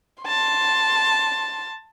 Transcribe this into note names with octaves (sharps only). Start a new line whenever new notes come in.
A5 C6